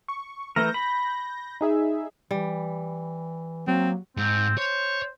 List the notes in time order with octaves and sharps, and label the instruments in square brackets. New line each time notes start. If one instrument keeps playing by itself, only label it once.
[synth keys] C#6
[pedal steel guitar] E3 A3 A#4 [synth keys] G6 A#6
[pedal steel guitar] B5
[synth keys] D#4 G#4 E5
[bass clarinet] E3 [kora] G3
[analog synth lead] F#3 [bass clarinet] A#3 [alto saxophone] C4
[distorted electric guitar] G#2 [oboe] C4
[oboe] C5 [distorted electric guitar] C#5